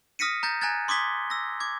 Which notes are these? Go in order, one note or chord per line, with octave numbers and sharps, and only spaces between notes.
D#6 F6 A#6 B6 C#7 D#7
A#5 G6 A6 A#6
G#5 A#5 F#6 G#6 A6
C6 D6 D#6 G#6 B6 G7
E6 A#6
D6 G#6